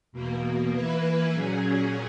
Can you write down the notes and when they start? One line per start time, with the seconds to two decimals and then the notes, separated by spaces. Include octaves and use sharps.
0.12 E2 B2 A#3
0.73 E3 A#3 E4 B4
1.33 A#2 F#3 C#4 G#4